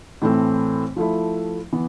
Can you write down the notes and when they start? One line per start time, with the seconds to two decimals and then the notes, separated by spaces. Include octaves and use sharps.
0.22 A2 E3 A3 C4
0.96 F3 A3 E4
1.72 E3 B3